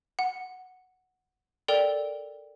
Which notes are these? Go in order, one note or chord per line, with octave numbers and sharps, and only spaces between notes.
F#5
A4 A#4 D5 G5 F7